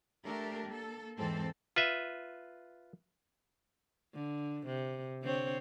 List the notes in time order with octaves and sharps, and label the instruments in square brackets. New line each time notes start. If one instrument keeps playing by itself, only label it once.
[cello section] A3 D4 G4 A4 A#4
A#3 A4
E2 G#2 E3 C4 A4 C5
[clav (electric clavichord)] F4 B4 E5
[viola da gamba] D3
C3
D3 C4 C#5